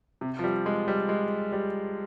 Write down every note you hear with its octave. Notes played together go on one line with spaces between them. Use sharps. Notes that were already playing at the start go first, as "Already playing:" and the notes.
C3
F3
G3
G#3
G3
G#3
G3